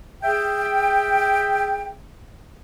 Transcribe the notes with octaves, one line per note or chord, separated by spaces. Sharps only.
G#4 E5 G5